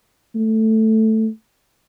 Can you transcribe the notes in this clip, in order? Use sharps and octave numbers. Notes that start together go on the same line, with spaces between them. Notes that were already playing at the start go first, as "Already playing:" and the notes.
A3